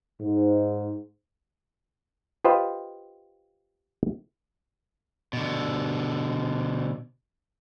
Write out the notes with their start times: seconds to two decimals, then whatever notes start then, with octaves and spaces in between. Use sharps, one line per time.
0.21 G#2
2.45 F4 G4 B4 C5 D#5 F5
5.33 B2 D3